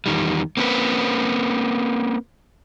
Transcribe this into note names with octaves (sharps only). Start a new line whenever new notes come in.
E2 D#3 G3
A#3 C4 C#4 F#4 B4